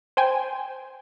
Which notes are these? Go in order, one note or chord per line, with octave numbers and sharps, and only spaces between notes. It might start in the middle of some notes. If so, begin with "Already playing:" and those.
C5 G5 G#5